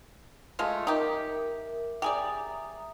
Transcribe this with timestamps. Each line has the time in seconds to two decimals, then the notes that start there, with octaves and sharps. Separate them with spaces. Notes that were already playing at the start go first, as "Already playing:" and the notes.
0.59 G#3 A3 F4
0.87 D#4 G4 A#4 E5
2.02 G4 G#4 D5 E5 A#5 D#6